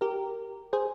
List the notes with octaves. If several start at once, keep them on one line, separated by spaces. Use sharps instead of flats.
G4 A#4
G#4 C5